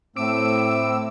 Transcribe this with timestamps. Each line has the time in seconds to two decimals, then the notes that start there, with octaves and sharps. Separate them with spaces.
0.17 A2 A3 C4 D6 E6